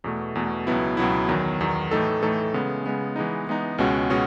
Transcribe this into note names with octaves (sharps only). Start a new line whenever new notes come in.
E2 B2 A3
E2 B2 A3
C#2 B2 F#3 B3 E4
C#2 B2 F#3 B3 E4
E2 D#3 F#3
E2 D#3 F#3
A2 E3 A3 D#4 A4
A2 E3 A3 D#4 A4
C#3 G#3 B3
C#3 G#3 B3
E3 G#3 B3 D#4
E3 G#3 B3 D#4
C#2 B2 G#3 C#4 F#4
B2 G#3 C#4 F#4